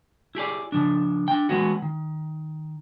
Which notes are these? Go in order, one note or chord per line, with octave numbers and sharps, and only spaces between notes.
E4 G4 G#4 D5
C#3 F3 D4
D4 G5
E3 G#3 B3 C#4 F#4
D#3